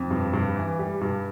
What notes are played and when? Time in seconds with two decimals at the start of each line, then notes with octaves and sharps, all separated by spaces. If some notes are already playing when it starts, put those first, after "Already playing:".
Already playing: F2
0.11 G2
0.33 G2
0.56 E3
0.79 G3
1.01 G2